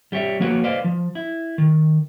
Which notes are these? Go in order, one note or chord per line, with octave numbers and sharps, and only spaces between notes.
G3 G4 C#5 E5
F3 A#3 B3 F#4 B4 C#5
B4 C5 D5 D#5 F5
F3
E4
D#3